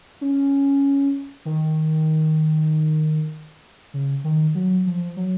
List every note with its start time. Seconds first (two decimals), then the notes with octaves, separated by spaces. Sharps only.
0.21 C#4
1.45 D#3
3.94 C#3
4.24 D#3
4.55 F#3
4.86 F3
5.16 F#3